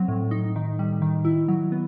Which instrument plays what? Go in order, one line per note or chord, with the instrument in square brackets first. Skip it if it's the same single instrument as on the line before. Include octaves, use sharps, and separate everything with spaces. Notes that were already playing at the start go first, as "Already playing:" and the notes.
Already playing: [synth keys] F#3 C4
A2
D#4
D#3
G3
D#3
E4
F#3
B3